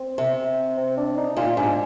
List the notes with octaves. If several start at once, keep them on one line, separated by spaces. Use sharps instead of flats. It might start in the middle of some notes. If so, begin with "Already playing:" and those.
Already playing: C4
C3
C4
D4
D#4
A#2 F4
G#2 D4